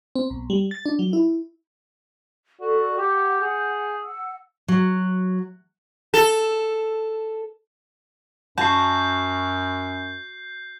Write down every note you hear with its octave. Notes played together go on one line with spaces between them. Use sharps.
C4
B1
G3
A6
D4
F#3
E4
F#4 A4 D5
G4 F#5 G6
G#4
F#5 E6
F#3
A4
F#2 F#4 A5 G6 C7